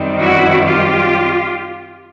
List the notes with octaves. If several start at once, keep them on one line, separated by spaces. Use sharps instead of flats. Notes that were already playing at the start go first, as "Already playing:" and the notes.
Already playing: F#2 D#3 G3 C4
E4 F#4
F4 G4